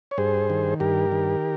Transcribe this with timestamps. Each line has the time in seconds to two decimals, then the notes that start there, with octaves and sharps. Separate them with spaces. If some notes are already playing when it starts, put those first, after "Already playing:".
0.11 C#5
0.18 G2 G#4 C5
0.50 D#3
0.80 G2 G4 A#4
1.12 D#3